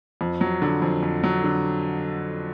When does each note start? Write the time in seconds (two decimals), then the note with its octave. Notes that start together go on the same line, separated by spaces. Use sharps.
0.21 F2
0.41 F#3
0.62 D3
0.82 F2
1.03 F2
1.24 F#3
1.44 D3